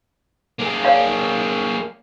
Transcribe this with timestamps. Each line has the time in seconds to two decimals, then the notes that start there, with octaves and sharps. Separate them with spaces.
0.60 A#3 G#4
0.84 C#5 D5 F5